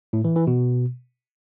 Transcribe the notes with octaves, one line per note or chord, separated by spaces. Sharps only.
A2
E3
E3
B2